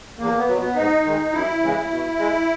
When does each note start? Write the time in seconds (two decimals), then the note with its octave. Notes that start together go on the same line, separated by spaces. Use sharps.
0.19 E2 A#3
0.38 B3
0.48 B2 F#3
0.58 B3
0.76 G#2 D#4
1.05 D#3 G#3
1.33 F#2 E4
1.63 C#3 E3 G#3
1.90 B2
2.19 G#3